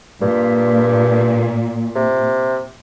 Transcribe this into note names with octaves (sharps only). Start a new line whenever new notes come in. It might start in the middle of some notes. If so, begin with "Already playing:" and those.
G2 A#2
C3